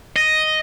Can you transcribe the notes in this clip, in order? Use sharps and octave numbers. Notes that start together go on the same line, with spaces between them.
D#5